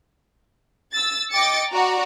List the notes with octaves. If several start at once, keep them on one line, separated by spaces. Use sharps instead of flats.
E6 A6
D#5 G5 D6 A6 C#7
F#4 D5 A#5